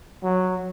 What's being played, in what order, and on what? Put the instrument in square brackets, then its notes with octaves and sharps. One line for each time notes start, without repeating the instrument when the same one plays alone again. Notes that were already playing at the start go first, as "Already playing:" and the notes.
[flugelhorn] F#3